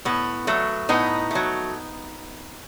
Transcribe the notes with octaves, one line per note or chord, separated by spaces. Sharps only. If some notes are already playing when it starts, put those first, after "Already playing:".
A2 B3
F#3 A3
A2 B3 D#4
F#3 A3